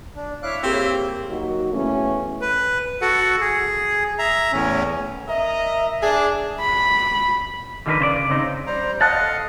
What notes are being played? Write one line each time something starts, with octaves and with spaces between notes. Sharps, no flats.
D4
E4 C#5 F5 D6 E6 F#6
A#3 C4 F4 G4 G#4
F#3 A#3 D#4 F#4
C#3 E3 A3 B3 C#4
B4
F#4 A4 F#5
G#4
E5 A#5
E2 A2 C#4
A#4 D#5 E5 A#5
D4 G#4
B5
D3 D#3 F4 G#4 A#4 B4
C#3 C5 D5
C#3 C4 D#4
G3 C5 A#5
D5 D#5 F5 F#5 A5 F#6
A4